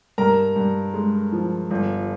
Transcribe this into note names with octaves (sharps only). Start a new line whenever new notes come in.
G2 A#4 A#5
G2
G#3
F3
G1